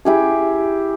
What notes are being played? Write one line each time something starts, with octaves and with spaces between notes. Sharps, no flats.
E4 G4 G#4